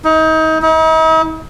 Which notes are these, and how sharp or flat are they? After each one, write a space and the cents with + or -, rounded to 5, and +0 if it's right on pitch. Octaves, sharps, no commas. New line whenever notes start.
D#4 +30
D#4 +45